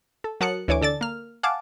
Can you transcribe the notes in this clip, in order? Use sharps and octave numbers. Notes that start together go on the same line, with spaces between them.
A4
F#3 A#4 A5 D#6 F#6 C#7
D2 E3 C#5 G#5 D6
D3 A4 D5 A6
A#3 F6
F5 F#5 G#5 A5 D6